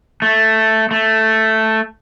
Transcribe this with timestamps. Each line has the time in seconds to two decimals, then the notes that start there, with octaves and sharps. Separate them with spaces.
0.22 A3
0.91 A3